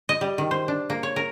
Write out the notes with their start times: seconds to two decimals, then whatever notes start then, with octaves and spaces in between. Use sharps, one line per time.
0.09 D#5
0.21 G3
0.38 D#3
0.51 C5
0.68 D4
0.90 A#3
1.03 C#5
1.16 A#4